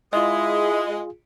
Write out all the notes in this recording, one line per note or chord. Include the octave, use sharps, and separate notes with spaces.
G#3 E4 F4 G#4 D#5 E5 D#6